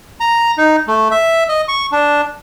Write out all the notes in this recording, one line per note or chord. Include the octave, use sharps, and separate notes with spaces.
A#5
D#4
A3
E5
D#5
C#6
D4